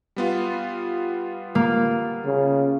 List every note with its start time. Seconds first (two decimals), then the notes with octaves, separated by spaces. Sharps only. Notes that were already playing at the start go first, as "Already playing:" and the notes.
0.16 G3 B3 F4
1.55 A#3
2.26 C#3